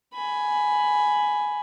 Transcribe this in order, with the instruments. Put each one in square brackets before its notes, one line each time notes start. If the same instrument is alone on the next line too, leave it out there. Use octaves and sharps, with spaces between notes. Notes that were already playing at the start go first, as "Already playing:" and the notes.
[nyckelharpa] G#5 B5